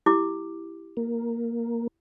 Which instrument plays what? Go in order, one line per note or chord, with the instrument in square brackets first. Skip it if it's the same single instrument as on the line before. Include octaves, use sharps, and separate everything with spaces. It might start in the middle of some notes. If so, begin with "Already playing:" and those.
[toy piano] E4 G4 D6
[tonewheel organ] A#3